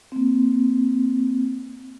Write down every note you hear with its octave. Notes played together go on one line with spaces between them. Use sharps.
A#3 C4